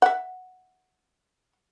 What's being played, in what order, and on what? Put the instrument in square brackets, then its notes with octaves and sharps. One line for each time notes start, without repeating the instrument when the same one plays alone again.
[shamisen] E5 F#5